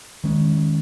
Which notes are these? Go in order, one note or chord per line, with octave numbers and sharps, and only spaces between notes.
D#3 G#3 C#4